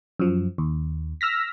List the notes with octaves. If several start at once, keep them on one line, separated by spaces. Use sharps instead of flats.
F#2 F3
D#2
E6 F6 A#6 B6